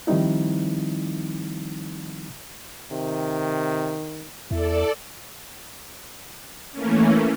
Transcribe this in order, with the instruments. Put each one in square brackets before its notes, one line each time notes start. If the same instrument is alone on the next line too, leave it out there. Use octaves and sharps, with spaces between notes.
[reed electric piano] D#3 F3 G3 C4 D#4 E4
[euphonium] C3 [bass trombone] D#3
[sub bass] E2 [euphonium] E4 [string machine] A4 D5
[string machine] E3 A3 A#3 C#4